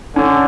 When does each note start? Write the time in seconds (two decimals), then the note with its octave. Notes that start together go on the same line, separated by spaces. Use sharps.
0.16 D3 C#4